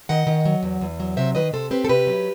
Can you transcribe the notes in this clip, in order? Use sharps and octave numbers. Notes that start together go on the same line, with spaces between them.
D#3 D#5 F#5
D#3
F#3
E2
E2
F#3
C3 C5 E5
D#3 B4 D#5
C3 A4 C5
C4 G4 B4
A4
C3 G4 B4
F#3